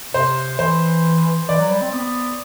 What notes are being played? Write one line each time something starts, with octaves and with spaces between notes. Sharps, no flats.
C3 C5
E3 C5
E3 D5
F#3
G3
C4
B3